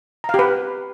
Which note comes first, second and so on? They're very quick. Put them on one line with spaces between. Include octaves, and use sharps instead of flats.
A#5 F5 G4 B4